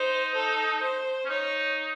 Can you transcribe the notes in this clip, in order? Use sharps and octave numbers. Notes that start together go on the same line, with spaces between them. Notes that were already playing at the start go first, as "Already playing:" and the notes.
Already playing: D#4 C5
A4
C5
C#4
D#4 C#5